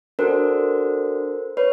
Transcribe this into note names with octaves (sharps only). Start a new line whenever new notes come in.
D4 F#4 A4 A#4 C5
B4 C#5